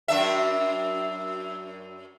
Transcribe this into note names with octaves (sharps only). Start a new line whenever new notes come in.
F#2 D4 E5